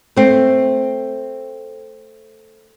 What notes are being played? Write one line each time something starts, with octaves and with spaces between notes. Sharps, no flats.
A3 C4